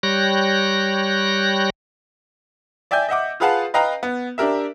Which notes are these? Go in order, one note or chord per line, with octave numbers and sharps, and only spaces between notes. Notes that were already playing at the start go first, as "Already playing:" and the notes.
G3 C#5 G5 F#6 A#6
D5 E5 G5 G#5 G6
D#5 E5 F#5 D6
F4 G#4 B4 F5 F#5 A5
B4 D#5 F5 G5 A#5
B3
D4 G4 A#4 E5